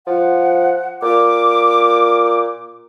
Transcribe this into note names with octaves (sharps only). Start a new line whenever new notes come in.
F3 F#5
A#2 D6